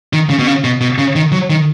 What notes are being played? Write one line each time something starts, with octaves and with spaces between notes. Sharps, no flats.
D#3
C#3
B2
C#3
B2
B2
C#3
D#3
F#3
D#3